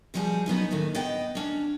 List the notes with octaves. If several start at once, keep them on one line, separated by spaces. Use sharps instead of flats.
B2 F3 G3 F#4 G#4
F#3 B3 C#4 D#4
D#2 A2 D#3 A3
B3 D#5 G5
C#4 D4